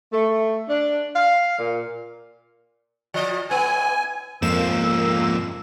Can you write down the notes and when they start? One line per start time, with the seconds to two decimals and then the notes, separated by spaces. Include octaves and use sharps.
0.13 A3
0.69 D4
1.16 F5
1.59 A#2
3.14 F3 D#5
3.50 A2 B3 G#5
4.42 F2 G#2 F3 A#3 E6 E7